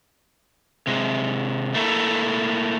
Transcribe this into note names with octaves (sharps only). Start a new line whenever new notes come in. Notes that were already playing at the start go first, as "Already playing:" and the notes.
C3 G#3
A3 A#3 E4 A4